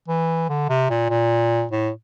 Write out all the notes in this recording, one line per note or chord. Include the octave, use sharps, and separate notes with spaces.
E3
D3
C3
A#2
A#2
A2